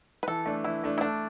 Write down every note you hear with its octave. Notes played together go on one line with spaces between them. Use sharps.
B4
E3 A4
A3 D4
E3 E4
A3 D4
E4
A3 D4